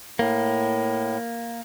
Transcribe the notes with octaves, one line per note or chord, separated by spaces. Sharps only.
A2 A#3